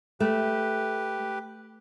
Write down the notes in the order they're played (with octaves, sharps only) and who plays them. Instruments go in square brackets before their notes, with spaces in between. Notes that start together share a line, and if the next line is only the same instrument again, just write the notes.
[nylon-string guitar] A3 [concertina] G4 B4